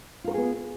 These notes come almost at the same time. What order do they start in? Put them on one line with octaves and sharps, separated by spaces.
F4 A#4 F#4 G#4 B3